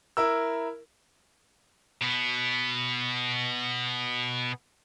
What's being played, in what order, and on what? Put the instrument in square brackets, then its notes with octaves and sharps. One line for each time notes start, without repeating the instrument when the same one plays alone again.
[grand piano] E4 A#4 E6
[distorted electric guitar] B2 B3